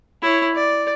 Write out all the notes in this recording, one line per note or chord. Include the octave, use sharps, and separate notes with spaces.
E4 C#5
D5